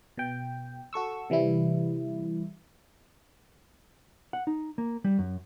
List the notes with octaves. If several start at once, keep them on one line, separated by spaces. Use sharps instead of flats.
B2 G5
F#4 A4 C#6 E6
C3 E3 G3 E4
F#5
D#4
A#3
G3
F#2